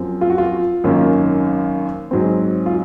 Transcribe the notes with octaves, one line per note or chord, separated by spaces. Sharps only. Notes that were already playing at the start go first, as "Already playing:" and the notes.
Already playing: F#2 F3 C4
F4
F#4
F4
G#1 F#2 D#3 A#3 C#4
G#2 F#3 C4
F4